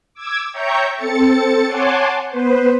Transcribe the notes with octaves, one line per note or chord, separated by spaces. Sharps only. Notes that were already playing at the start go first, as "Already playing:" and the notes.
D6 E6 G#6
C#5 E5 G5 A#5 C#6 G6
C4 A4 A6 C#7
C#5 F#5 G#5 A5 C6 D6
B3 B4 C5